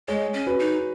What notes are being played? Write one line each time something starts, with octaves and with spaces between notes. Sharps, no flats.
G#3 G#4 C#5
C#4
F#4 B4
D#4